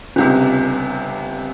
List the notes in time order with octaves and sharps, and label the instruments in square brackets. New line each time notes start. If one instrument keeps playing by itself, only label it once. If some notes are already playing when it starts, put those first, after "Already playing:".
[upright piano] G1 C#2 C3